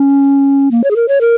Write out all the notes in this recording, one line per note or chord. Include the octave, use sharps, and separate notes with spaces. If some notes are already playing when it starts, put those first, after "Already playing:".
Already playing: C#4
A#3
C#5
G#4
A#4
C#5
A#4